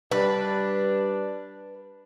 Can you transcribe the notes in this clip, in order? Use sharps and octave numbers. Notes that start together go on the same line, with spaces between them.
G3 D4 B4